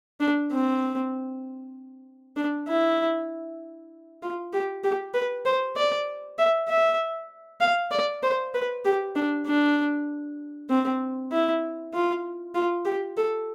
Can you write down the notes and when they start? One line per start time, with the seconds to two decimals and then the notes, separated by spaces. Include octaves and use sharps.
0.20 D4
0.52 C4
2.36 D4
2.68 E4
4.22 F4
4.53 G4
4.84 G4
5.14 B4
5.46 C5
5.76 D5
6.38 E5
6.69 E5
7.61 F5
7.91 D5
8.23 C5
8.54 B4
8.85 G4
9.16 D4
9.46 D4
10.70 C4
11.32 E4
11.94 F4
12.55 F4
12.85 G4
13.17 A4